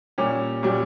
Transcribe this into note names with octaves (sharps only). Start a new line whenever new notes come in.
A#2 G3 C#4 G4
A#2 G3 C#4 G4